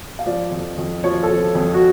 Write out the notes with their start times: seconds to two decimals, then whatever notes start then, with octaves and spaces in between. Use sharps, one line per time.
0.19 F5
0.26 F3 D5
0.51 F2
0.78 F2
1.04 F3 C#5
1.23 A4
1.30 F3
1.55 F2
1.74 F#4